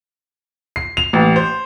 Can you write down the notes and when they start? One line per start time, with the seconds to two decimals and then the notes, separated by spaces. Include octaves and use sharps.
0.76 C7
0.97 F7
1.13 A1
1.36 C5